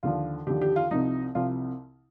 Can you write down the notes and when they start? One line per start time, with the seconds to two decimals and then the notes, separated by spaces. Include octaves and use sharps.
0.03 D#2 D3 F3 F4
0.47 D#2 D3 F3 G4
0.61 G4
0.76 F4
0.91 C2 C3 F3 D#4
1.35 C2 C3 F3 F4